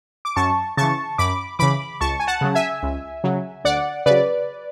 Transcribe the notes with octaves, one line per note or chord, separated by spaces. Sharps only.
D6
F#2 A5 C#6
C#3 E3 A5 C#6
F#2 B5 D6
C#3 E3 B5 D6
C#2 A5 C#6
G#5
F#5 A5
C#3 F#3
E5 G#5
C#2
C#3 F#3
D2 D5 F#5
C#3 F#3 B4 D5